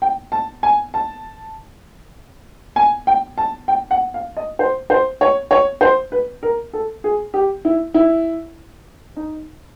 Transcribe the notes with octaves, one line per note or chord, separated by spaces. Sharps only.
G5
A5
G#5
A5
G#5
G5
A5
G5
F#5
F5
D#5
C5
C5
C#5
C#5
C5
B4
A#4
A4
G#4
G4
E4
E4
D#4